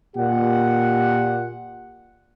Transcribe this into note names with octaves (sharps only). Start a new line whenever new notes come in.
A#2 G4 F#5